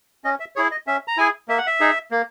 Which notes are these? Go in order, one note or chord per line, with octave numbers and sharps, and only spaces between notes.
C#4 D#5
E5
E4 G#4 C#5
D#5
C#4 E5
A#5
E4 G#4 G#5
A#3 E5
F#5
E5
D#4 G#4
A#3